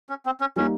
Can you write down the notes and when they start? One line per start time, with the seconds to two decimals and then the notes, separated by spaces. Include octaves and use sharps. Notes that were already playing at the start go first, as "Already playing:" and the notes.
0.09 C#4
0.26 C4
0.40 C#4
0.56 G3 A#3 C#4 D#4